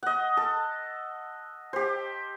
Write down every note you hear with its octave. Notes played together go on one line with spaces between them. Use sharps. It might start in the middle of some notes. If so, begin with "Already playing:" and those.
D#5 F#5
A4
G4 C5